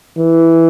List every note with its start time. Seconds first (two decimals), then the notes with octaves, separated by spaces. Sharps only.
0.18 E3